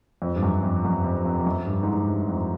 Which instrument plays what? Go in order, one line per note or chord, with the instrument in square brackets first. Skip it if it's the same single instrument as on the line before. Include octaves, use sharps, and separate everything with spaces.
[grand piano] F2
G2
F#2
F2
F#2
F2
F2
F2
F#2
G2
G#2
A2
G2
F2